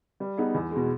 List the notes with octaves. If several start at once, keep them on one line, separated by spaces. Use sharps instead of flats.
G3
B3 D#4 G#4
E2
B2 G#3